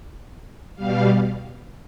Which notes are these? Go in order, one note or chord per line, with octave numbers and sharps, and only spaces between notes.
B2 G3 F5